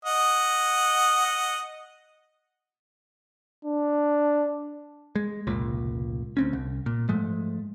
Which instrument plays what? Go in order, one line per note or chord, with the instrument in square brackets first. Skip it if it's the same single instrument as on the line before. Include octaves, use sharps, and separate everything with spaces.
[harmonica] D#5 F#5
[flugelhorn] D4
[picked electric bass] G#3
F1 C#2 A#2
D2 C4 C#4
C2
A#2
G#2 F3 G#3 A3